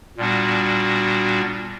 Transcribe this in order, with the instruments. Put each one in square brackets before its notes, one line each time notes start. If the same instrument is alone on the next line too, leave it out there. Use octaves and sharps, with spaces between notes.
[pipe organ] A#2 G3 B3 D4 F#4